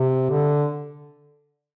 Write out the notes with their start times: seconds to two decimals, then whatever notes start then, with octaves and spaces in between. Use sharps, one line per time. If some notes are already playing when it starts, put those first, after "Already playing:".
Already playing: C3
0.31 D3